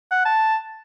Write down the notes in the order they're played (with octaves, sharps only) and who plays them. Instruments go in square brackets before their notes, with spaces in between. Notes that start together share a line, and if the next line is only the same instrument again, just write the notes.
[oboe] F#5
A5